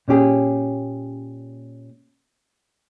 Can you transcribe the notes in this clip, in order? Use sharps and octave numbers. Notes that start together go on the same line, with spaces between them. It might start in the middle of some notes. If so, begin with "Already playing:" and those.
A#2 C#4 G4 G#4